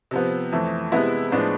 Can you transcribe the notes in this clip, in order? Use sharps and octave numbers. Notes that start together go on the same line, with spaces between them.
C3 F3 B3
F2 E3 A3
C3 G#3 B3 E4
A2 F3 G#3 B3 D4